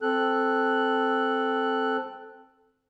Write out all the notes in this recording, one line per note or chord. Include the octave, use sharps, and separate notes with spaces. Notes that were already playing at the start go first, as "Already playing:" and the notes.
C4 A4 F#6